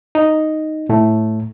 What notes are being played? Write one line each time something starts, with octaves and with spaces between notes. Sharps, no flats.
D#4
A2 A3